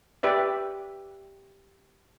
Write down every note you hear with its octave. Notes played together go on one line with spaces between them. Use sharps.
G4 B4 D5 E5